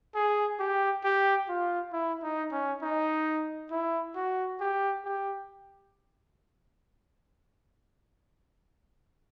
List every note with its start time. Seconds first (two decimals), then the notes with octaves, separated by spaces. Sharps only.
0.15 G#4
0.59 G4
1.04 G4
1.49 F4
1.93 E4
2.23 D#4
2.52 C#4
2.82 D#4
3.71 E4
4.16 F#4
4.60 G4
5.05 G4